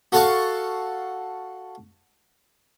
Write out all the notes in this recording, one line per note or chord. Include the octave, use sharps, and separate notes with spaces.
F#4 A4 F5 F#5 A5 C#6